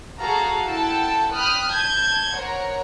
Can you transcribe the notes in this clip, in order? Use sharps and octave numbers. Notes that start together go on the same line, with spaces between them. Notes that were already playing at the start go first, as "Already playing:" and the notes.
F#4 G#4 A4 F5 F#5 A#5
E4 A4 F#5 G5 A5 E6
G5 B5 D#6 F6 F#6
A5 G6 G#6
A#4 C5 C#5 F#5 A#5